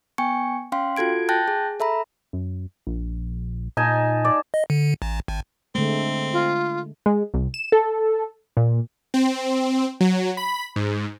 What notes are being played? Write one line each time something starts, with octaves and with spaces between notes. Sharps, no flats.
B3 G5 G#5 C#6 C#7
C#4 F5 G5 C6
F4 F#4 A4 G#6 D7
G5 A5 F#6 G6 A6 A#6
G#4
A4 E5 A#5 B5
F#2
A#1
A#2 D#4 G#5 A5
D5
D#5
D3
A1
G#1
D3 G#3 A3 C4
F4
G#3
C2
E7
A4
A#2
C4
F#3
B5
G#2